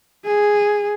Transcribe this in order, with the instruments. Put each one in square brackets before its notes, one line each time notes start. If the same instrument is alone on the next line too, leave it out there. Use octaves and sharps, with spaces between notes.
[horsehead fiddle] G#4